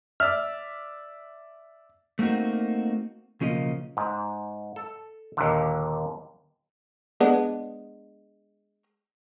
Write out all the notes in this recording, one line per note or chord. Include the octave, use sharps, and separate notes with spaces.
D5 E5 F6
A3 A#3 C4 D#4 F#4
B1 C#3 F3 A#3 D#5
G#2
A4
D#2 A#2 D3
G#3 B3 D4